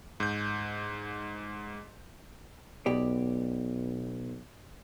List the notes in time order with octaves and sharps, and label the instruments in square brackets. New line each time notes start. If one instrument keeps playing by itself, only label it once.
[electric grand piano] G#2 G6
[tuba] B1 [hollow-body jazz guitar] B2 G4 D5